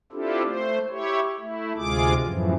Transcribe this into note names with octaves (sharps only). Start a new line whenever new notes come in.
C4 D4 E4 F4 G4 A4
A3 C5
E4 G4 C#5
A3 E4
D2 C3 G#3 F4 G#4 D6
F#2 A2 E3 F3